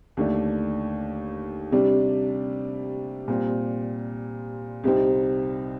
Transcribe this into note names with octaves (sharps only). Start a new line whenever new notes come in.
D#2 D3 A3 D4
C3 G3 D4
A#2 G3 C4
C2 C3 G3 C4 D#4